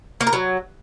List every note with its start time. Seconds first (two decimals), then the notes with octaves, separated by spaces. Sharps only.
0.21 A#3
0.27 A#4
0.33 F#3